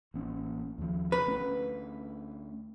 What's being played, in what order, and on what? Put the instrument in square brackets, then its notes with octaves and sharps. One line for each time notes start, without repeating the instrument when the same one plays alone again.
[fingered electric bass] A1 A#3 C#4
D#2 F3
[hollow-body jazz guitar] B4
[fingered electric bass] D2 A3 C#4